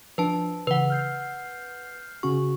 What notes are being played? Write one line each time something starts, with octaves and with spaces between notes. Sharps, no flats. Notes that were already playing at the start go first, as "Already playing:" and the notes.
F3 D4 B4 A5
C#3 E3 B4 F#5
F6 G6 C7
C#3 C#4 F#4 C#6